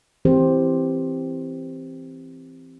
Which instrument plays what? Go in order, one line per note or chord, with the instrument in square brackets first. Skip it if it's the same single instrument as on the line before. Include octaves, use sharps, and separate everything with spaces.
[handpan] E3 C4 G4 C5